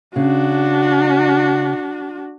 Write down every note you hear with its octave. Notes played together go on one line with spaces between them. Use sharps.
C#3 D4 F#4